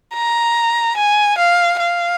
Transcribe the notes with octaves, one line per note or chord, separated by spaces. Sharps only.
A#5
G#5
F5
F5